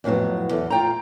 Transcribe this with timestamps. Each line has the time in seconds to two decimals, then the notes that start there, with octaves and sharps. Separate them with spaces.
0.04 F2 A2 F3 F#3 B3
0.51 E2 A4
0.70 F4 G5 A#5